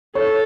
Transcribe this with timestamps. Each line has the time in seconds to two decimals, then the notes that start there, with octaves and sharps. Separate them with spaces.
0.15 A4 C#5